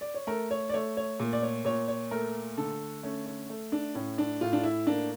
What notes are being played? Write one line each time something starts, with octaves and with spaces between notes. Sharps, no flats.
D5
C#5
A3 A#4
C#5
D5
A3 C#5
C#5
A#2
D5
C#5
A#2 C#5
C#5
A3 A#4
D3 A4
A3 C#4
C#4
A3
D4
A2 C#4
D4
A2 F4
D4
E4
A#3 D4